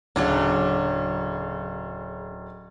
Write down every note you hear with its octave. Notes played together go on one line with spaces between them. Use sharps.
D1 C#3 F#3 D4